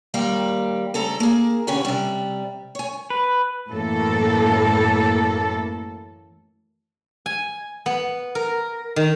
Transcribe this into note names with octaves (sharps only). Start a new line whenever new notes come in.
D#2 G3 A#3 F5 G5
D2 C#3 A4 A#5
A#3 G#4
B2 D3 C#4 G4 C#5 F5
C3 G3
C#5 G#5
B4
F#2 A2 E3 A#3 A4
G#5
B3
A#4
D#3